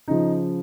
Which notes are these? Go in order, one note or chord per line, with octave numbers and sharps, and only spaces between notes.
C#3 F3 D#4